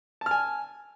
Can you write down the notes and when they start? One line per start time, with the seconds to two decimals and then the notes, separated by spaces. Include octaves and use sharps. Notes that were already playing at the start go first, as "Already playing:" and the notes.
0.21 A5
0.26 F6
0.31 G#5